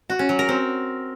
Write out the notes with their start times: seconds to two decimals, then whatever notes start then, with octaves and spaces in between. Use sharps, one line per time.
0.10 F#4
0.19 C#4
0.29 F#3
0.39 A#4
0.49 C4